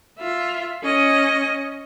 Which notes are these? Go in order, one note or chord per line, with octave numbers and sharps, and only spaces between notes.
F4 E5
C#4 D#5